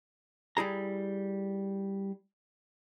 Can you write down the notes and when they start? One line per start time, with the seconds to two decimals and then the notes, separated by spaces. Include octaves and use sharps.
0.57 G3 E4 G#4 A#5